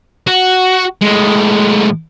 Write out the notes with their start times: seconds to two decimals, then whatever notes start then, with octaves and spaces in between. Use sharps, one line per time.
0.27 F#4
1.01 A2 G#3